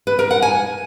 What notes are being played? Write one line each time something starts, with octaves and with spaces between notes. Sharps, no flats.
B4
A#4
F#5
G#5